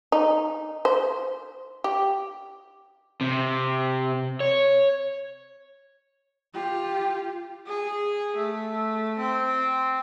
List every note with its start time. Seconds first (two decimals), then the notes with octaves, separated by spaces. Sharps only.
0.12 D#4
0.85 C5
1.84 G4
3.21 C3
4.40 C#5
6.54 F4 G4
7.67 G#4
8.36 A3
9.18 C4